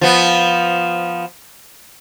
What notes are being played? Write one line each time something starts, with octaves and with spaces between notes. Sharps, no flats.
F3 B3